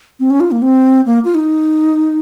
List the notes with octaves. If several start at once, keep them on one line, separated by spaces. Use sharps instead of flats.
C4
C#4
F4
A#3
C4
A#3
F4
D#4